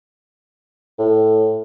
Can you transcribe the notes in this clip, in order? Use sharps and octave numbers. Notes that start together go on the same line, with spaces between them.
A2